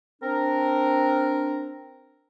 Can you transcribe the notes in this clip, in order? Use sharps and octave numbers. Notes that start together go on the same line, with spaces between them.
C4 D4 A#4